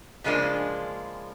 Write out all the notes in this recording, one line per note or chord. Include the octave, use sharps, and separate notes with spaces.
C#3 F3 G#3 A#3 D4